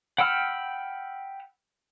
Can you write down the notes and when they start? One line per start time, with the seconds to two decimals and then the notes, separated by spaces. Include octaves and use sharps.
0.18 F#5 G5 B5 E6 F6